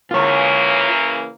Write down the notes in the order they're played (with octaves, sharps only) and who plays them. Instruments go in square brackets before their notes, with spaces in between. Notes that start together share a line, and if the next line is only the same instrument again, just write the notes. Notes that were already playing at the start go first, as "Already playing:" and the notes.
[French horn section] C#3 E3 A#3 [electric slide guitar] F4 C#5